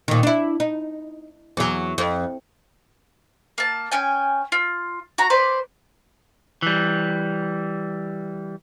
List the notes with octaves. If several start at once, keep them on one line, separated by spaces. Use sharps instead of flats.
A#2 D#3
D4 E4
D#4
E2 F#3
F2
A#3 A5
C#4 G5 G#5
F4
F#4 A#5
B4 C5 D5
E3 G3